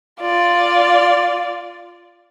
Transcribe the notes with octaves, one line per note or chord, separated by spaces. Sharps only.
F4 D5